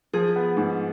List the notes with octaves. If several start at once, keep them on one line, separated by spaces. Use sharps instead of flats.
F3 G#4
B3
G#2